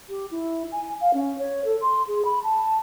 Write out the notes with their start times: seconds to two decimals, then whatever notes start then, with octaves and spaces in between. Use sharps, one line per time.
0.09 G4
0.31 E4
0.72 G#5
1.01 F5
1.14 C#4
1.39 C#5
1.65 A4
1.81 C6
2.08 G#4
2.25 B5
2.43 A5